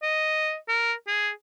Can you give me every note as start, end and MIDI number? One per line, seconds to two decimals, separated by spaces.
0.02 0.56 75
0.68 0.93 70
1.07 1.31 68